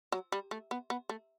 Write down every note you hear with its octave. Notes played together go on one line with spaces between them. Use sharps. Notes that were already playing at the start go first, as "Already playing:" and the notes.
F#3
G3
A3
B3
B3
A3